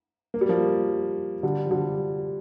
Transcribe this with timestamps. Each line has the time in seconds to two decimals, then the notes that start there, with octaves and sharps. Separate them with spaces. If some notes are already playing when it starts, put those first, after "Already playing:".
0.34 A#3
0.41 G3
0.49 F3 A#3
1.43 D3 G3
1.65 F3
1.71 D3 G3